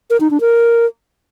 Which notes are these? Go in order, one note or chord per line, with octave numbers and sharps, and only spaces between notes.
A#4
D#4
D4
A#4